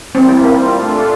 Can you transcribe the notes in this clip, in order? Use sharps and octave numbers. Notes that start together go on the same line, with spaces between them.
E3 G3 A#3 C4 E4
C4
G3 A#3 C4 F4
A#2 A3 D4 F4 A4